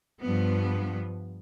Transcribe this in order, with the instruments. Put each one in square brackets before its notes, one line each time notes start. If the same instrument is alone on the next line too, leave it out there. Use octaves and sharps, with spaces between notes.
[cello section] G2 F3 B3